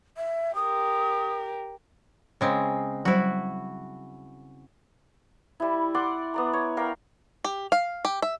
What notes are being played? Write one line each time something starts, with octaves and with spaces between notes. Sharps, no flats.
E5
G4 A#4 D#6
C#3 G#3 C4
F#3 G3 E4 F#4 C5
G3 E4
D5 F#5 C6 D6
B3 D5 A#5
C#5
A#4 D5 F5 G5
G4
F5
G4
E5